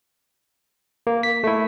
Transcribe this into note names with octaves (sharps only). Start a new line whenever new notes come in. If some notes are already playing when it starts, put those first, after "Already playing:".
A#3
B6
A3 E4